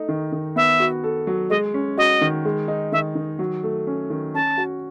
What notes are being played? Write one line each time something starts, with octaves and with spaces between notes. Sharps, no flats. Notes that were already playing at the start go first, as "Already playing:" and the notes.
Already playing: A3 D#4
D#3
D#3
B3 E5
F#4
A4
F#3
G#3 D#5
C#4
F#4 D#5
D#3
G#3
D#4
D#3 E5
D#3
F#3
A3
C#4
D#3
C#4 A5
F#4